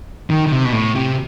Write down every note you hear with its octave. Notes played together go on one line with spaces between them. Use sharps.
D#3
D#3
C3
B2
A2
C3